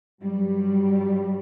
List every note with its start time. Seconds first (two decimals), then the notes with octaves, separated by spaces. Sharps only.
0.21 G2 F#3 G3